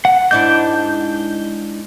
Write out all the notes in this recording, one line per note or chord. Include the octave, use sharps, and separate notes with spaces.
F#5
G#2 D4 E4 G6